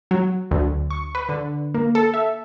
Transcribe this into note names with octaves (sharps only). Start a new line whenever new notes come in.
F#3
D2
C#6
B4
D3
A#3
A4
E5